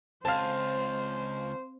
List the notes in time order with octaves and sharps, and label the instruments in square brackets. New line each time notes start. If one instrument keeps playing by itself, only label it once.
[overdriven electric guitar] C#2 [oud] C4 [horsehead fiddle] C5 [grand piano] F5 A5